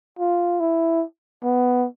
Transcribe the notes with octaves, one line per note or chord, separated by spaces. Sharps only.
F4
E4
B3